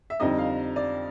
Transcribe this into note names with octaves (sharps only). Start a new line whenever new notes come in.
E5
F2 D3 G3 C4 D#4 D#5
F5
D5